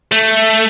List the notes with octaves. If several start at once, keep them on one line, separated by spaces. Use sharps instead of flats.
A3